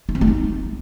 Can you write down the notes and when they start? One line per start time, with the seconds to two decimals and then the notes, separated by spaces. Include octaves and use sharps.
0.09 D4
0.15 C4
0.21 A3
0.28 D#4